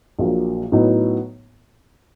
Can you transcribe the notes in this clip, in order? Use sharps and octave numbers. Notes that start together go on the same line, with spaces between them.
A#1 A#2 F#3 A#3
A2 F#3 B3 D#4